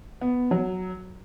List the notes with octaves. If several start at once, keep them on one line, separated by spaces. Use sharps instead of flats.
B3
F#3